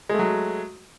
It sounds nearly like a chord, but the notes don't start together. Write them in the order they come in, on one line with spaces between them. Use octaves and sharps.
G#3 A3 F#3